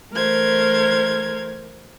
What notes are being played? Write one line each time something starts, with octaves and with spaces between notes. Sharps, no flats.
E3 A3 A#4 C5 G#6